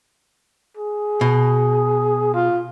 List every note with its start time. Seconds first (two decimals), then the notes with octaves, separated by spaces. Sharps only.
0.77 G#4
1.21 B2
2.34 F4